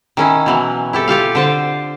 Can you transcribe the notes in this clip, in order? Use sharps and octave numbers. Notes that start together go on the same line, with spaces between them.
D#3 C#4 E4
B2 E3 F#3
E4 G4 A4
F4 G4 A4 F5
D3 C5 A5